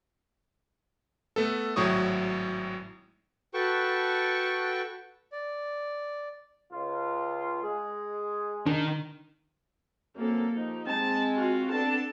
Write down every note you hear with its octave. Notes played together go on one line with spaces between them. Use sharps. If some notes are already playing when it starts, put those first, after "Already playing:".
A3 B3 A4
G#1 A2 F#3 E4 C#6 D#6
F#4 A4 B4 G5 A5 C#6
D5
C#2 F4
G#3 G#4
D#3 D4
F#2 A#3 C4 A4
F3 D#4 G4
G#3 C4 A5
F4 F#4
B3 D4 A4 A5